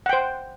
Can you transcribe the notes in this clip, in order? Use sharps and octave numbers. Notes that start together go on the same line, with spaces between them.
C5 F#5 G5